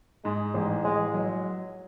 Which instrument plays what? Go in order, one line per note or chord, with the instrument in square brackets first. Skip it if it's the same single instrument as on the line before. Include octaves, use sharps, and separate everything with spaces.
[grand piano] G#2 [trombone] G#3
[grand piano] A1 [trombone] G#3
[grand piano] A1 [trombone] G#3
[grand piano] F#3